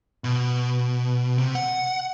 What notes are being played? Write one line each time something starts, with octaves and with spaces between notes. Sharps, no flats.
B2
C3
F#5